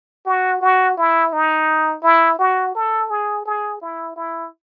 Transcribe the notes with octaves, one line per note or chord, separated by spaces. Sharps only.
F#4
F#4
E4
D#4
E4
F#4
A4
G#4
G#4
E4
E4